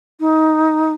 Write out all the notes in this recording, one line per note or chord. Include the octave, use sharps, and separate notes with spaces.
D#4